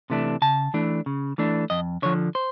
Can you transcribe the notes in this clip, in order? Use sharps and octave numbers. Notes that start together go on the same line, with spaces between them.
C3 E3 A3 D4
C#3 A5
E3 A3 D4
C#3
E3 A3 D4
F2 D#5
D3 F3 C#5
C5